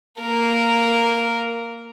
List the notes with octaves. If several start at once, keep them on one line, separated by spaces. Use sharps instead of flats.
A#3 A#4